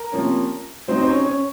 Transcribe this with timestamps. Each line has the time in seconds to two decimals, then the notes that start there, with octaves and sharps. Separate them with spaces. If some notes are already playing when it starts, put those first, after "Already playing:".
Already playing: A#4
0.12 C3 F3 A#3 C#4
0.87 C3 F#3 C4 D#4 C5
1.02 C5
1.07 C#4 C#5
1.25 C#4 C#5